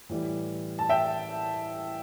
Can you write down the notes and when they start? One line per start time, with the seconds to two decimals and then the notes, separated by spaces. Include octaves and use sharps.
0.09 A2 E3 G3
0.79 A5
0.89 E5 G5